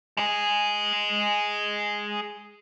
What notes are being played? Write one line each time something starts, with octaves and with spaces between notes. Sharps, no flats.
G#3 G#4